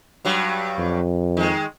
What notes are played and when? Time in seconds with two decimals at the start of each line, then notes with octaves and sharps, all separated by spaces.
0.25 G2 F#3 G3
0.79 F2
1.37 D#3 G#3